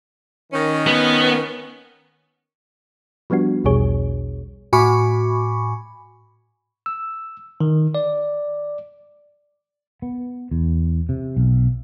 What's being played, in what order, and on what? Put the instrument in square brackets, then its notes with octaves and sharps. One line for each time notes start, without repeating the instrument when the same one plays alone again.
[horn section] D#3 C#4
[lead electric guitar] B3
[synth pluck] F3 G3 B3 D4 F#4
B1 E2 B2 G3 G#4 C#5
[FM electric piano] A2 F#4 G#5 B5 C#6 D6
[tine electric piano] E6
D#3
D5
[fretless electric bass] B3
E2
C3
B1